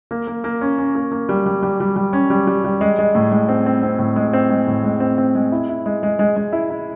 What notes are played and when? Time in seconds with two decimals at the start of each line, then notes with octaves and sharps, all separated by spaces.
0.11 A#3
0.27 A#3
0.44 A#3
0.61 C#4
0.78 C#4
0.95 A#3
1.12 A#3
1.29 G3
1.46 G3
1.63 G3
1.80 G3
1.96 G3
2.13 C#4
2.30 G3
2.47 G3
2.64 G3
2.81 G#3
2.99 G#3
3.15 A2
3.32 G#3
3.49 C4
3.66 C4
3.83 C4
3.99 A2
4.16 G#3
4.33 C4
4.50 G#3
4.68 A2
4.84 G#3
5.00 C4
5.18 C4
5.35 G#3
5.52 E4
5.69 E4
5.86 G#3
6.03 G#3
6.19 G#3
6.36 G#3
6.53 E4
6.70 E4